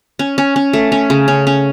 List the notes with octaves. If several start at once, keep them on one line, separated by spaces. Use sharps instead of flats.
C#4
C#4
C#4
A3
C#4
C#3
C#4
C#4